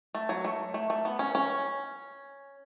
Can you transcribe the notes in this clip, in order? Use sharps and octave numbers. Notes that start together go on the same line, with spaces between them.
A3
F#3
A3
A3
A3
B3
C#4
C#4